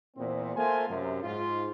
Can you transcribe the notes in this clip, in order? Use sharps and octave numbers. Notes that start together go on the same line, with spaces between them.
E2 A#2 B3 C4
A3 A#3 F4 C5 G#5
F#2 C3
G#2 F4